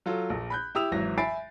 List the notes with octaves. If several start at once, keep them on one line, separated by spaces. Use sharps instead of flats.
F#3 F4 A4
A#1 A#2
B5 F#6 G6
E4 G4 D#6 E6 F7
G#1 E3 F#3 A#6
E5 G#5 B5 A6 C7 D7